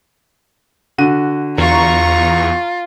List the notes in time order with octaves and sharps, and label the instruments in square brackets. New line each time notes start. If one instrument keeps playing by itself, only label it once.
[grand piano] D3 F#4 D#7
[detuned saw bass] E2 [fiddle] F4 [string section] A#5 C#6